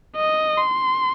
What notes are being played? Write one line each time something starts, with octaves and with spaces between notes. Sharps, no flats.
D#5
C6